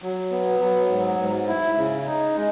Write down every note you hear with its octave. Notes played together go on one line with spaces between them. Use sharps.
F#3
B3
F#3
G#2
G#2
E4
C#3
D#4
G#3